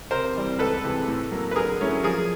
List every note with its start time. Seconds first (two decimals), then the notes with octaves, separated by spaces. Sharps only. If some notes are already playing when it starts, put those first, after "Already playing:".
0.11 C3 A#4 C5
0.36 E3 G3 C4
0.59 C#2 A4 B4
0.84 C3 E3 G#3 C4
1.08 A2
1.31 F#3 A#3
1.51 B4
1.56 D3 G#4 A#4
1.80 F#3 A3 C#4 E4
2.03 F3 G#4 A#4